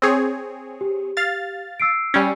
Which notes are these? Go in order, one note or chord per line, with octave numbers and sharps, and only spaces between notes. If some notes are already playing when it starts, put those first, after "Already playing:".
C4 G#4 C#5
G4
F5 A6
E6 C7 D7
G3 C#4